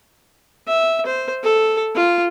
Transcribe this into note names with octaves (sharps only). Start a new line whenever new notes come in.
E5
C5
A4
F4